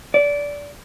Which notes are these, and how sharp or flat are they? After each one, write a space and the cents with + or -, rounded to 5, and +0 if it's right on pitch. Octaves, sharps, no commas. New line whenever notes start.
D5 -20